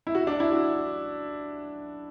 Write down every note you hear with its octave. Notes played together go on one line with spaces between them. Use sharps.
E4
F#4
D4
E4
F#4